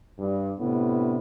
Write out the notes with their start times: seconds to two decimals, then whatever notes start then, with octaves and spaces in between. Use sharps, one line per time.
0.19 G2
0.59 A2 C3 B3 D4